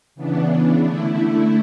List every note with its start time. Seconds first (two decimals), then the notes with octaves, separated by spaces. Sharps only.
0.15 C#3 E3 B3 D4
0.80 D3 A3 E4